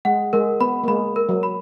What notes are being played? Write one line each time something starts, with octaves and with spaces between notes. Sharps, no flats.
G#3 F#5
G#3 A#4
B3 B5
A#3
G#3 B5
A#4
F#3
B5